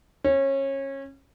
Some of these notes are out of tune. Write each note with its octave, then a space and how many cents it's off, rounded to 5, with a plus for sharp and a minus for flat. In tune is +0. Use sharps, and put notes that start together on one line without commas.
C#4 -25